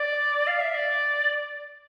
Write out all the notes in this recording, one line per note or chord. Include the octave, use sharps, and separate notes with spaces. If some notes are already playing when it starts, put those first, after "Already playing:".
Already playing: D5
F5
E5
D5